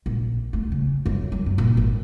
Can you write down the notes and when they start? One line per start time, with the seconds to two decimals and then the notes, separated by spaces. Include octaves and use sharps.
0.06 A#1
0.53 A3
0.72 C#3
1.06 F#2
1.32 F#3
1.46 F#2
1.58 A#2
1.77 G#1